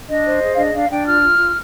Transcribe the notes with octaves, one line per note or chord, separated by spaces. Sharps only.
D4 D#5
C5
G#4
F5
D4 D#5
D4 F5
D4 G5
F4 F6
F4
F4